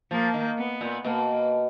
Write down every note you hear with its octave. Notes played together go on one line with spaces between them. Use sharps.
F3 A#3
D#3
B3
A#2
B2 A#3